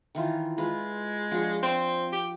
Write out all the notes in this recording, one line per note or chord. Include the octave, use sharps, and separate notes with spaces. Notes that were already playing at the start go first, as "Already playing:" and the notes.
D#3 E3 F4
G#3 F4 B4
F3 D4 F#4
C4
G4